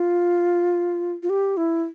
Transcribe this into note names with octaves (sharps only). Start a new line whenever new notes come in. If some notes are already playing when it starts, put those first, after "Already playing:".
Already playing: F4
F4
G4
E4